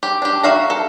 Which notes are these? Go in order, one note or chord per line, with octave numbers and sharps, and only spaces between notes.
G4
D4 G4
F#4 E5 F5 A#5
A4